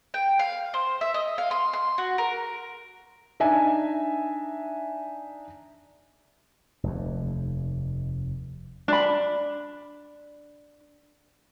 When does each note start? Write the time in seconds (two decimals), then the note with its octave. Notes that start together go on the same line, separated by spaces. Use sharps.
0.14 G5
0.39 F5
0.74 C5
1.01 E5
1.14 D#5
1.38 F5
1.51 C6
1.73 C6
1.98 F#4
2.18 A#4
3.40 D4 D#4 E5 G#5
6.83 F1 D#2
8.88 D4 B5